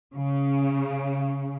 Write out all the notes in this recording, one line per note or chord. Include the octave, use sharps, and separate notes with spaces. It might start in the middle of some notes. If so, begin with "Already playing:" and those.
C#3